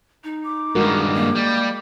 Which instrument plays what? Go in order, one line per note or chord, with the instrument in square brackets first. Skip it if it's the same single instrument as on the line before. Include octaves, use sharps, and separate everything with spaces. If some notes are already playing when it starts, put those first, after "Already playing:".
[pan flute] D#4
[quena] D6
[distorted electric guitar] G2 D#3 [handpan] G#3 F#4 A#4
[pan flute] A#3
[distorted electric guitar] G3